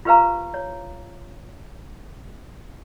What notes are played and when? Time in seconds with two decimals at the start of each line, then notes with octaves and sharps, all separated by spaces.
0.05 F4 G4 B4 C5 F5 A#5
0.54 C#5